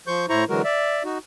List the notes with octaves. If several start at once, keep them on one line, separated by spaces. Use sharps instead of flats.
F3 C5 C#6 G6
A2 E4 C5 A#5 C#6
D3 E3 F#3 G#3 F#4 A#4
D5 E5
D#4 F#4